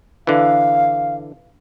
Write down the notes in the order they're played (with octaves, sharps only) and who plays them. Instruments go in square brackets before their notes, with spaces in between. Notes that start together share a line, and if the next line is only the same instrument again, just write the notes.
[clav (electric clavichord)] D3 E3 [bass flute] F5